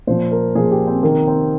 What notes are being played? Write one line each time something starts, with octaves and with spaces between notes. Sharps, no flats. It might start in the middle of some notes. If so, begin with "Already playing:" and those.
A#2 F3 C5
A#4
A#2 F3 G#4
G4
C4
C3 D#3 A#3
C4